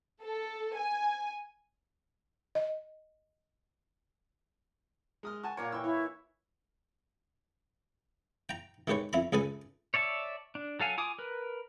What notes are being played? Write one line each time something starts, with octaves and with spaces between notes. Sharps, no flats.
A4
G#5
D#5
G#3 D#6 F6
F#4 G#5 A5 C#6
A#2 A#3 A#4 C#5 F5
E3 G5 C#6 E6
E4 C#5
G5 A#5
D#3 G#3 G4 B4 C#5
F2 E4 A#5 B5
C#2 G#4 A4 B4 G#5
C#5 D5 E5 A5
D4
F#3 A4 F5 G#5
F4 G#5 D6 D#6
A#4 B4